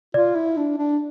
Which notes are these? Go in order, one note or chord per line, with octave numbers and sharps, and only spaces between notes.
F4 D5
E4
D4
D4